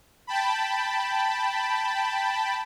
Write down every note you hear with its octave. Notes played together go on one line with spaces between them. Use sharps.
G5 A5 B5